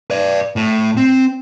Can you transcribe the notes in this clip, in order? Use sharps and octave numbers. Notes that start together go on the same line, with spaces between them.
B4 D5
A2
C4